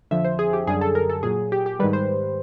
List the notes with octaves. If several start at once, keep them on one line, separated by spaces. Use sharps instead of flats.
F2 D3 F3 E5
C5
G#4
G4
F#2 D3 G3 G#4
A4
A#4
A4
A#2 F#3 G#4
G4
G4
G#2 D#3 G3 B4
C5